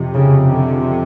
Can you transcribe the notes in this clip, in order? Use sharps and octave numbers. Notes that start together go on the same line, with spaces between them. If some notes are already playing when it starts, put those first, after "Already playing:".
Already playing: F2 C3
C#3
D3